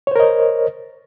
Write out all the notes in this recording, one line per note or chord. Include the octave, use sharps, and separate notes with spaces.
A#4 C5 C#5 D#5